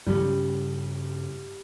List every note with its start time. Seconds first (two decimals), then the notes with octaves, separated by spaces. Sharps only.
0.06 G2 C#3 G3 C#4